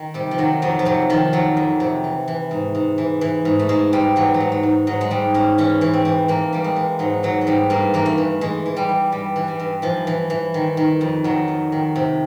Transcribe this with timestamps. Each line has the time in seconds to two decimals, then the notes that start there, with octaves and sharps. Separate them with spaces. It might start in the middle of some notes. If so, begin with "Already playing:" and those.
Already playing: D#3
0.14 C3 G3
0.31 F3
0.38 D#3 F#3
0.62 F2 F#3
0.79 F3
0.85 C3 F#3
1.10 D#3 F3
1.33 F2 F#3
1.57 F2
1.80 C3
2.04 E3
2.28 E3
2.51 G#2
2.75 G#2
2.98 E3
3.21 E3
3.45 G#2
3.59 A3
3.69 G#2 G#3
3.92 G#2 G3
4.16 E3 F#3
4.34 F#3
4.40 G#2
4.52 F#3
4.63 G#2
4.87 G#2 F#3
5.01 G#3
5.11 G#2 G3
5.34 G#2 C#4
5.58 E3 C#4
5.81 E3
5.93 C4
6.05 E3
6.28 E3 A#3
6.53 E3 G3
6.64 G#3
6.76 E3
6.99 G#2 F#3
7.23 E3 F#3
7.41 F#3
7.47 G#2 G3
7.70 G2 A#3
7.94 E3 A#3
8.06 A3
8.18 E3
8.41 E3 G#3
8.66 E3
8.77 G3
8.89 E3
9.12 G2 G3
9.36 E3
9.48 G3
9.60 G2
9.82 E3 F3
10.07 E3
10.30 E3
10.54 D#3
10.77 D#3
11.01 F2
11.24 D#3 F#3
11.48 F2
11.72 D#3
11.96 C3